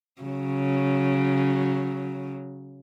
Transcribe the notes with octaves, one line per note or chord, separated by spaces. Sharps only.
C#3 F#3